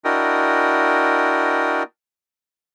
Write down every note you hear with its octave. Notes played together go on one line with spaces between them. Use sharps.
D4 E4 F#4 A#4 D#5 G5